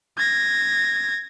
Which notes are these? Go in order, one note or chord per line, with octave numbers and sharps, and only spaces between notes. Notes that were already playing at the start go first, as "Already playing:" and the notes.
G#6 A#6